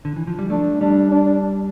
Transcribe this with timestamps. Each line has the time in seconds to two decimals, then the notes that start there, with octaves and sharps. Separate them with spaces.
0.05 D3
0.16 E3
0.27 F3
0.39 G3
0.50 A3 D4
0.81 G3 D4
1.11 D4